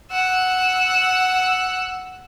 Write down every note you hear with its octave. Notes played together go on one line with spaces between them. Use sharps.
F#5 E6